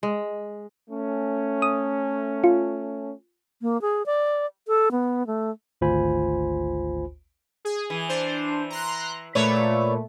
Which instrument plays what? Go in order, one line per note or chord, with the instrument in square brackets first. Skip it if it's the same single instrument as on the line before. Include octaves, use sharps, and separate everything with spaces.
[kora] G#3
[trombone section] A3 C#4
[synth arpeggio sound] D#6
F4
[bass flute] A#3
G#4
D5
A4
B3
A3
[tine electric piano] G#1 D2 F4 C5 G#5 B5
[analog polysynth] G#4
[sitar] E3
[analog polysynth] D4 C5
A#5 C6 F#6
[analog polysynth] A#2 A3 [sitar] B4 C#5 D5